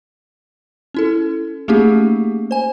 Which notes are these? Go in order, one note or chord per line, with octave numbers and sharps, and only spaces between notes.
C#4 E4 A4
A3 A#3 C#4 D#4 G4 G#4
C5 G#5